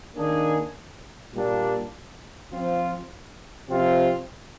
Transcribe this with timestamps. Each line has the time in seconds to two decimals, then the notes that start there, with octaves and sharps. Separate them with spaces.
0.16 D#3 A#3 D4 G#4
1.33 A#2 G3 D4
2.51 F3 C4 F4
3.68 C3 F3 C4 F4